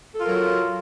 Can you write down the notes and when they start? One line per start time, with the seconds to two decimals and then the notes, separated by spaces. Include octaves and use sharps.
0.14 A4
0.19 F4
0.23 A#4
0.27 F#3